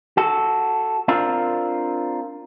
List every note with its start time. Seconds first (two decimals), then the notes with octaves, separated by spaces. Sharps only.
0.17 F#4 A4
1.08 C4 D4 F4 A#4